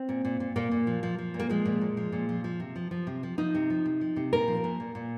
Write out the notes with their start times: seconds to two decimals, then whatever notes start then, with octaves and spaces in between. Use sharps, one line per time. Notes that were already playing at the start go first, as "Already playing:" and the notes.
Already playing: C4
0.09 A#2
0.25 A#2
0.40 A#2
0.56 A#2 A#3
0.71 A#2
0.87 F3
1.03 F3
1.18 F3
1.34 A#2
1.40 A#3
1.50 F3 G#3
1.65 A#2
1.81 A#2
1.97 F3
2.12 A#2
2.29 F3
2.44 F3
2.60 C3
2.76 F3
2.91 F3
3.07 C3
3.23 F3
3.38 F3 D#4
3.55 C3
3.70 F3
3.86 C3
4.01 F3
4.16 C3
4.33 A#2 A#4
4.48 F3
4.64 A#2
4.80 A#2
4.95 A#2